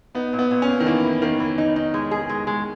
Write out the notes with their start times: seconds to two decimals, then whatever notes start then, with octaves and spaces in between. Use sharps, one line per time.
0.15 B3 D#4
0.33 A#2
0.39 B3
0.51 A#2
0.62 C#4
0.68 A#3
0.80 D#3
0.86 E3 A#3
1.05 E4
1.22 D#3 A#3
1.40 E3
1.58 D#4
1.76 D#4
1.94 G#3
2.11 G#4
2.30 G#3
2.47 G#3